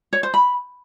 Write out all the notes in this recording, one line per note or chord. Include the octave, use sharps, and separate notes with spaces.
C#5
C5
B5